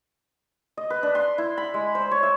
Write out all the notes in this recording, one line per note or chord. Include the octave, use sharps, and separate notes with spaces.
D#5
B4
D4
C6
E4
B5
G#3
C5
C#5
E5